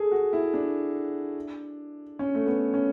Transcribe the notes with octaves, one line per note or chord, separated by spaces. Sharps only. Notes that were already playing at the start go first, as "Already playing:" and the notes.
Already playing: G#4 A4
F#4
E4
D4
C#4
A3
B3
C#4